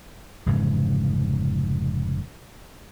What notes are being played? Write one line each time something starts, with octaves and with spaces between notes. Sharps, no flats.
F1 G#2 C#3 E3